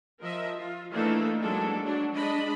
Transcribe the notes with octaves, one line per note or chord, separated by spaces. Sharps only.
F3 A#4 D#5 E5
F4
E3 A3 A#3 D4 D#4 A4
F#3 G#3 A#3 D4 A4
F#3 D4 F#4
G#3 D4 D#5 B5